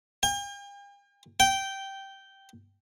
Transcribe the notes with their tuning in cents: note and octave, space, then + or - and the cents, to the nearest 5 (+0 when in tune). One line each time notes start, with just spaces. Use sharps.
G5 +45
G5 -10